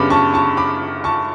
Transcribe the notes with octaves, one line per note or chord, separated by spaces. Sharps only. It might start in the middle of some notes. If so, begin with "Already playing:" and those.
Already playing: F#2 C#3 G3 B3 D4 B5 D6
A5 C#6
A5 C#6
B5 D6
A5 C#6